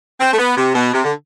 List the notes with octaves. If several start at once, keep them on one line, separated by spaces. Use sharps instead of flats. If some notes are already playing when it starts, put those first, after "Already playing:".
C4
A3
B3
C3
B2
C3
D3